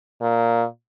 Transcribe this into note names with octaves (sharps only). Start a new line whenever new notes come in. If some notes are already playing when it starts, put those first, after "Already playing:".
A#2